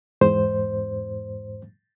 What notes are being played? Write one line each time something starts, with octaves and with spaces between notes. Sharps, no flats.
E2 G#2 C5